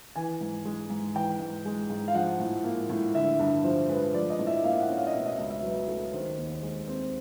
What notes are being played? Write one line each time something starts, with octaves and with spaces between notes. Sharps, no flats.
E3 G#5
G#2
G#3
G#2
E3 G5
G#2
G#3
G#2
F5
F3 F#5
A2
A#3
A2
D3 E5
G2
F3 C5
G#3 B4
F3 D5
D#5
A2
E5
A#3 F5
F#5
C#4
F5
D#5
B2 E5
D#5
C#2 D#5
E5
F#3 B4
A3
D#3 C5
D#2
G#3
C4